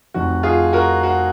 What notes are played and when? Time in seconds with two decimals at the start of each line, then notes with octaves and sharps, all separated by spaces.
0.14 F1 F2 D#3 F#4
0.43 F4 G#4
0.73 F#4 A#4
1.03 F#4